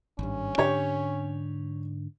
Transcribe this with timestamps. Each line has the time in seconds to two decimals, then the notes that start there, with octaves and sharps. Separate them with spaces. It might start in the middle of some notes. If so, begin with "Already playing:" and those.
0.19 G#1 G2 C#4
0.58 G#2 D3 D4 G4 C#5